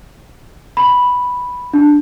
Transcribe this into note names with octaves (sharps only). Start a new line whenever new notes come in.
B5
D4